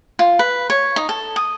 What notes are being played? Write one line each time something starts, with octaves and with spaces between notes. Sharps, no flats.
F4
B4
C#5
D#4
A4
D#6